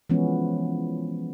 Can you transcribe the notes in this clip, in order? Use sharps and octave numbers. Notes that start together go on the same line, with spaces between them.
E3 F3 G#3 B3 C#4